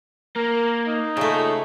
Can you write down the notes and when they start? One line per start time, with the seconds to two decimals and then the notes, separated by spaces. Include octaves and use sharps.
0.36 A#3 A#4
0.87 D#4
1.17 C#3 A3 F4 A#4